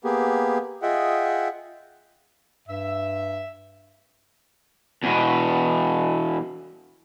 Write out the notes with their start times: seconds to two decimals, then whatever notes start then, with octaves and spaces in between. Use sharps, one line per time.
0.04 A#3 B3 G4 G#4
0.82 F4 G#4 D#5 E5 F#5 G5
2.68 G2 E5
5.04 E2 B2